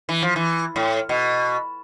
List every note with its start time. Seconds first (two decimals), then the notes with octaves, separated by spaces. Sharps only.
0.09 E3
0.22 F3
0.36 E3
0.76 A2
1.09 B2